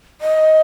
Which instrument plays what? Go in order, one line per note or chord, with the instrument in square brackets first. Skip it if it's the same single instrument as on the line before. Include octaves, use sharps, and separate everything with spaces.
[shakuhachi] D#5